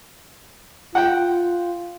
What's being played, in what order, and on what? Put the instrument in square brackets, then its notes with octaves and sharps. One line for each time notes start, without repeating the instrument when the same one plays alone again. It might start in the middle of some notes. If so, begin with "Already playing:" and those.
[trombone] F4 [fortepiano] F#5 G5